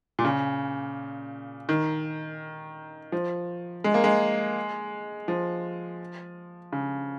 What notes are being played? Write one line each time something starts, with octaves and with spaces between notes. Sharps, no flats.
A#2
C#3
D#3
F3
G#3
A#3
G#3
F3
C#3